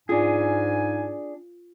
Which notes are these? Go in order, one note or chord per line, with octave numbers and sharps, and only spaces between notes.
G#2 D4 F4 G#4 G#5